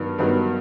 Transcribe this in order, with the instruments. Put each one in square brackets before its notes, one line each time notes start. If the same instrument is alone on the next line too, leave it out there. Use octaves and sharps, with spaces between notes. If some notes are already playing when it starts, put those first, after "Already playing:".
Already playing: [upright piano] G2 D#3 F#3 B3
G2 D#3 F#3 B3